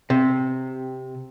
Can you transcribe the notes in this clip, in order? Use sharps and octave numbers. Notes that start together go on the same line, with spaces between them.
C3